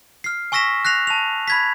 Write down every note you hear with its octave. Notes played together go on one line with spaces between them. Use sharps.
F6 C7
G#5 C#6 E6 A#6 B6 E7
F#6 A#6 C7 F7
A5 F7
B5 G#6 B6